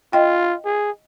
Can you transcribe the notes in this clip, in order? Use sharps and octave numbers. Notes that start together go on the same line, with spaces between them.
F4 D#5 G5
G#4